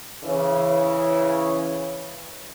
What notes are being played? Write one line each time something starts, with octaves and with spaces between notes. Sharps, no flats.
C#3 E3